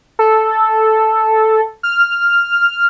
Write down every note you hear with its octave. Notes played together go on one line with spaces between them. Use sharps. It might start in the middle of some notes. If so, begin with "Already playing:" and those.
A4
F6